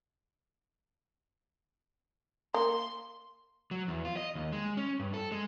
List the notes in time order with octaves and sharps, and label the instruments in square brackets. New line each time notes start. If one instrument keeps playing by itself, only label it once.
[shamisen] A#3 [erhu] C6
[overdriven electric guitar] F#3
E2
F4
D#5
D#2
G#3
C#4
G2
A4
G#3